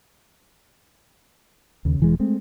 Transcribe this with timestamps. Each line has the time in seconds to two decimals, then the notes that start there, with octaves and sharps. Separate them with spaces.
1.85 D#2 C#3
2.00 E1 E3 G#3
2.20 G#3 A3 C4